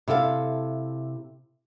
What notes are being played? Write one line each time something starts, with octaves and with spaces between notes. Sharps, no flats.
C3 E4 A4 F5